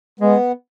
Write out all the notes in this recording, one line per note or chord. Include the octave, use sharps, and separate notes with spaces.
G#3 B3